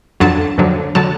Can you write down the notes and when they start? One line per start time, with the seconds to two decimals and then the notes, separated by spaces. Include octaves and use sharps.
0.20 F2 D3 F#3 A5
0.58 F2 D3 F#3
0.95 D3 F#3 A5